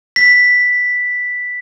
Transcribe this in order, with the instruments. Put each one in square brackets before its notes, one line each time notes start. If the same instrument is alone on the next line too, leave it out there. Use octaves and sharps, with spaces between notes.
[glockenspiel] B6